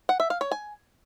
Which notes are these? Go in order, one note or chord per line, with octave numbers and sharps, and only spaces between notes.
F#5
E5
F5
C#5
G#5